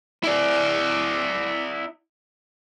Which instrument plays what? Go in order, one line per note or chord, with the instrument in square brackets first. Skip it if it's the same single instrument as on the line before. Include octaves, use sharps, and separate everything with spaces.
[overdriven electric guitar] E4 D5